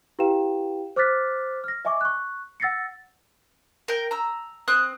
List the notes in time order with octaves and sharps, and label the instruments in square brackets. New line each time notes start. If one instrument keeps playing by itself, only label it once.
[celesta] E4 G4 B4 F5 G5 E7
C5 D6 F6 F#6 A6 B6
F6 A#6
D#5 E5 G#5 C#6 D6
C#6 F#6
F#5 E6 A6 A#6 C7 C#7
[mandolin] A#4 G5
A#5 E6
C4 D#6 F#6